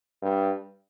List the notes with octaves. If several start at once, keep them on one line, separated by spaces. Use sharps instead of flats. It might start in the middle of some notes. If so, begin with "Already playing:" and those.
G2